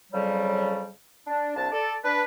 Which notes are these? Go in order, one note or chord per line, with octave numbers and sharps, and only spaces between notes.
F2 C#3 F#3 G3
D4
C2 D4 A5
A4 D5
D4 B4